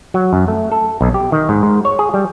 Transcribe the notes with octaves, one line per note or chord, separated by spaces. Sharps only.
F#3
F#2
A3
A4
B1
G4
D#3
G#2
G#2
C#5
G#4
G3